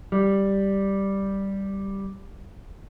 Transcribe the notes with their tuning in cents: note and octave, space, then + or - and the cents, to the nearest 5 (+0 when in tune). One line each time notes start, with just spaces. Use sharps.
G3 +0